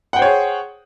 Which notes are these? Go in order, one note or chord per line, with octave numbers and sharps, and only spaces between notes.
G#4 C5 C#5 F#5 G5